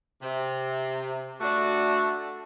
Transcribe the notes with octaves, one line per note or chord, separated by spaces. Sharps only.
C3
A3 D4 F#4